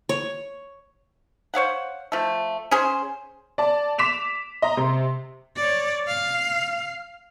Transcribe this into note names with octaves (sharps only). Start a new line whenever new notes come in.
C#5
C5 C#5 F5 F#5
F3 A3
C#4 G#4 C5
D5 A5
D6 B6 E7 F7
D#5 A#5
C3 C6
C#5 D5
F5